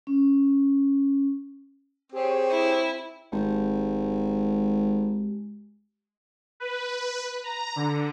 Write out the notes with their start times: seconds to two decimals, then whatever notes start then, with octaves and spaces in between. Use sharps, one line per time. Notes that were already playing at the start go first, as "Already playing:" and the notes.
0.07 C#4
2.13 C4 G4 G#4 C#5
2.51 E4
3.32 G#1 G#3 G4
6.60 B4
7.44 A#5
7.76 D3